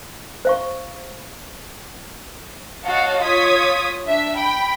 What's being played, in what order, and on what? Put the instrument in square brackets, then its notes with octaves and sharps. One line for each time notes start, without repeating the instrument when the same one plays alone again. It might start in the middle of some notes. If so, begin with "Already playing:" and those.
[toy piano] C5 F5 C#6
[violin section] F#4 C#5 D#5 F5 F#5 A5
F4 C#5 D#6 G#6 B6
D4 E5
G5 B5